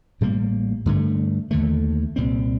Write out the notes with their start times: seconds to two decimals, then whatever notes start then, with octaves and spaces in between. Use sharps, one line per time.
0.21 A1 A2 G3 A#3
0.86 G2 D3 A3
1.51 D#2 D3 A3
2.16 C2 A#2 G3 C4